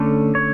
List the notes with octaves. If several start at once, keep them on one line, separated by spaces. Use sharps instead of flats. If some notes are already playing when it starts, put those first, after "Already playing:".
Already playing: D3 A3 C#4
C#5